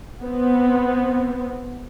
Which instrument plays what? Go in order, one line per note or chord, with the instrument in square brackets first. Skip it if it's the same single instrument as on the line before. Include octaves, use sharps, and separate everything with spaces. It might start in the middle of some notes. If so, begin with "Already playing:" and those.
[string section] B3 C4